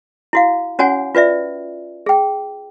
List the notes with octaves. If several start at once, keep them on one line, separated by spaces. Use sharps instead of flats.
E4 F#4 F5
C#4 F#4 C#5 F#5 G#5
F4 B4 D5 E5
G#4 G5